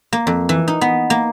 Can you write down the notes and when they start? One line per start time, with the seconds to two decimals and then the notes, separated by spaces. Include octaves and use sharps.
0.13 A#3
0.27 F2
0.49 E3
0.68 D#4
0.81 B3
1.10 A#3